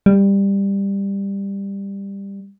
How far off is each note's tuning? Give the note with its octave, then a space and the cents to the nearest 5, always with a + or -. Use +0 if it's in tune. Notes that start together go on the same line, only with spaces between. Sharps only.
G3 +15